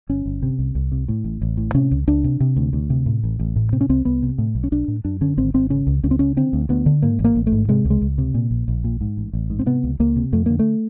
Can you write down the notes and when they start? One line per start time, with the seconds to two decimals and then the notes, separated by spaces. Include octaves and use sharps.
0.09 G1 C#4
0.26 G1
0.43 C3
0.59 C2
0.75 C2
0.92 C3
1.08 A2
1.24 A1
1.42 A1
1.57 A2
1.74 C3 C#4
1.91 C#2
2.07 C#2 D4
2.24 C3
2.40 C3
2.56 D2
2.73 D2
2.90 C3
3.06 A2
3.24 A1
3.39 A1
3.56 A2
3.72 C3 C4
3.81 C#4
3.89 C2 C4
4.05 C2 B3
4.22 C3
4.38 A2
4.55 B1
4.64 C#4
4.72 B1 D4
4.88 A2
5.04 F#2 D4
5.21 D3 C#4
5.37 G#1 C4
5.54 G#1 C4
5.70 C#3 C#4
5.87 C#2
6.03 C#2 C#4
6.11 C4
6.19 C#3 C#4
6.37 D3 C4
6.53 D2
6.69 D2 B3
6.86 D3
7.02 G#2 A#3
7.19 A1
7.24 A#3
7.35 A1
7.47 A3
7.52 G#2
7.68 C3 G#3
7.85 C#2
7.90 G#3
8.02 C#2
8.18 C3
8.34 A#2
8.51 A#1
8.68 A#1
8.84 A#2
9.01 G#2
9.17 A1
9.33 A1
9.50 G#2
9.59 C4
9.66 C3 B3
9.84 C#2
10.00 C#2 A#3
10.16 C3
10.33 F2 A3
10.46 D3 A#3
10.59 A3